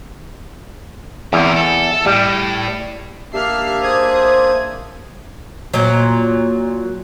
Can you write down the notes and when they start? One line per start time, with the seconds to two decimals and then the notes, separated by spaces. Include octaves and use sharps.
1.33 E2 C3 A#4
1.56 A4
2.06 A2 G3
3.33 A#3 D4 G4 E5 F6 C7
3.83 G#4 C5 D#6 G#6
5.74 A#2 F#3